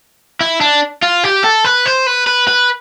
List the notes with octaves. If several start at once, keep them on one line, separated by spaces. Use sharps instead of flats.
E4
D4
F4
G4
A4
B4
C5
B4
B4
B4